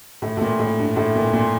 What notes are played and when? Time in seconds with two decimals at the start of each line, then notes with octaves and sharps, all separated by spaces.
0.22 A2
0.37 A2
0.41 A#2
0.59 A2
0.79 G2
0.96 A2
1.15 A#2
1.33 A#2